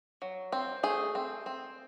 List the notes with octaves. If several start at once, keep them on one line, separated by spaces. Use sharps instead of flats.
F#3
C4
A3 G#4
C4
C4